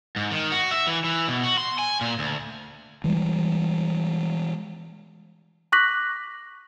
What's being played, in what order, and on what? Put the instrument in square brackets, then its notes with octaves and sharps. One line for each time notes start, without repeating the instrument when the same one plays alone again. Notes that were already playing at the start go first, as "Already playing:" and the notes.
[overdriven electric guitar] G#2
D#3
F#4
E5
E3
E3
B2
F#4
C6
G#5
A#2
D2
[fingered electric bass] E3 G3 G#3
[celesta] C#6 D6 F#6 A#6 B6 F#7